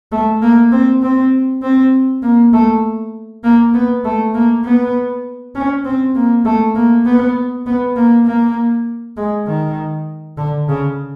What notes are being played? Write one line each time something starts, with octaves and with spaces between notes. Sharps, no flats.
A3
A#3
C4
C4
C4
A#3
A3
A#3
B3
A3
A#3
B3
C#4
C4
A#3
A3
A#3
B3
B3
A#3
A#3
G#3
D#3
D3
C#3